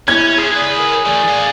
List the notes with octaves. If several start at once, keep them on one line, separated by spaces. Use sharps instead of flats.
C#4 E4 G#6
D4 G#4 C5
C#2 B4 D5
A#4
E3 A3 D5
D4 F5